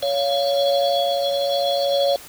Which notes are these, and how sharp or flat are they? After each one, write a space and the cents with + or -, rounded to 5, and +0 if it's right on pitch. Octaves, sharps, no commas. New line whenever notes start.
C#5 +20 F5 -10